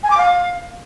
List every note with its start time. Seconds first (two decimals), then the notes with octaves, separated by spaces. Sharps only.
0.03 G#5
0.10 D6
0.18 F5